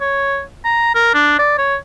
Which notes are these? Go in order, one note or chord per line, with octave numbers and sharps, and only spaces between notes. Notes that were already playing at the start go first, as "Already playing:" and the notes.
C#5
A#5
A#4
D4
D5
C#5